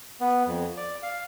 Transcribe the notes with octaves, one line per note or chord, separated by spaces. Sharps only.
B3
F2
D5
F5